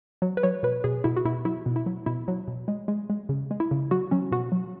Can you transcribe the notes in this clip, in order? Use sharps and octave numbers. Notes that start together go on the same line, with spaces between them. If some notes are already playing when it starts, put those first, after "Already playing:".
F#3
B4
F#3 C#5
B2 B4
B2 G#4
B2 E4
F#4
B2 E4
F#3 E4
B2
E4
F#3
B2 E4
F#3
B2
G#3
G#3
G#3
C#3
G#3
E4
C#3
F#3 F#4
F#3 C#4
B2 F#4
F#3